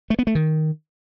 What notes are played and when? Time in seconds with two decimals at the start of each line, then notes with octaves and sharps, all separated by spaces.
0.10 A3
0.19 B3
0.27 A3
0.35 D#3